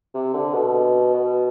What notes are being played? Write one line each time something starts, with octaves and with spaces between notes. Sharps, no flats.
C3
D3
B2
B2